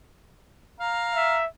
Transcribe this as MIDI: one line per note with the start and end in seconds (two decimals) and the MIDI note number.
0.80 1.40 77
0.80 1.40 82
1.15 1.46 76